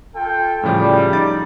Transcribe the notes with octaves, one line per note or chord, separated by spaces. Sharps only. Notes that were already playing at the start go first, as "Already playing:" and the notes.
F4 A4 G5
A2 C#3 F3 G3
D#4 D6 A6